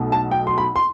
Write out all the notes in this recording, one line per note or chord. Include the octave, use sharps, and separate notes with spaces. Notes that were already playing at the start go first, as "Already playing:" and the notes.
Already playing: B1 B2 A3
A5
G5
C6
B5
C6